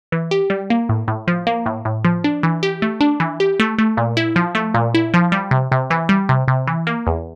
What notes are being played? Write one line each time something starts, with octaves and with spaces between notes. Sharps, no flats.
E3
G4
G3
A#3
A2
A2
F3
A#3
A2
A2
F3
D4
E3
G4
A3
D4
E3
G4
A3
A3
A#2
E4
F3
A3
A#2
E4
F3
G3
C3
C3
E3
G3
C3
C3
E3
A#3
E2